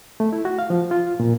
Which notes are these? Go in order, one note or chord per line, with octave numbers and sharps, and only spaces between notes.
A3
E4
F#4
F5
F3
F4
A#2